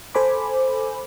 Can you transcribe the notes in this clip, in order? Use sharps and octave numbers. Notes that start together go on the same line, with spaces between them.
A4 C5 G#5 B5 D6